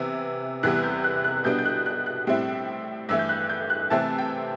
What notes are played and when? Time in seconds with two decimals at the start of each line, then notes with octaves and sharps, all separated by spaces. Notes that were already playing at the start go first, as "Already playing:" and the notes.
Already playing: C3 E3 B3
0.63 E2 C3 E3 G3 B3 F#6
0.84 G6
1.04 F#6
1.24 F#6
1.44 B2 G3 B3 D4 G6
1.59 G6
1.65 F#6
1.86 F#6
2.06 F#6
2.27 A2 G3 C4 E4
3.09 G2 E3 A3 E6
3.19 G6
3.29 F#6
3.50 G6
3.70 F#6
3.90 C3 E3 A3 C4 A5
4.18 G5